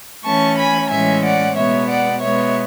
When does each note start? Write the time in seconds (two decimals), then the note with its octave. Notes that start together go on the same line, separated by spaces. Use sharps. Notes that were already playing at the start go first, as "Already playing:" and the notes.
0.25 E3 A3 C#4 A5 C#6
0.57 G#5 B5
0.90 A2 E3 G#3 C#4 E5 G#5
1.23 D5 F#5
1.56 B2 G#3 B3 C#5 E5
1.89 D5 F#5
2.22 B2 G#3 B3 C#5 E5